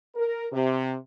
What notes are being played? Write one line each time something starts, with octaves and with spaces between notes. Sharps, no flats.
A#4
C3